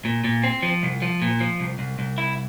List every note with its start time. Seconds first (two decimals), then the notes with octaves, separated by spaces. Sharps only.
0.05 A#2
0.24 A#2
0.44 C4
0.63 F3
0.83 C2
1.02 F3
1.22 A#2
1.40 F3
1.60 C2
1.79 C2
1.99 C2
2.18 E4